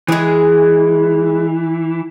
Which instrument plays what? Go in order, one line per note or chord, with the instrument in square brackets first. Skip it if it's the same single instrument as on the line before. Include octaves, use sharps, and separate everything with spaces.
[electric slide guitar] E3 [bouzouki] G#3 G#4